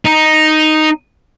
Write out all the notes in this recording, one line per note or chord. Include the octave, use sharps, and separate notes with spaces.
D#4